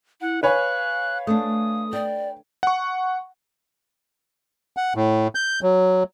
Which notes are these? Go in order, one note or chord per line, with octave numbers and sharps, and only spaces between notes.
E4 F#5
B4 C#5 F5 G#5 F#6
A3 D4 D#6
D5 G5
F#5 C#6
F#5
A2
G6
F#3